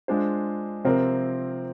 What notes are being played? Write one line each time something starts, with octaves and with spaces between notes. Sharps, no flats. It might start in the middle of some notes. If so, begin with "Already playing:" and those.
G#3 D4 F4 C5
C3 F3 C4 F4 A#4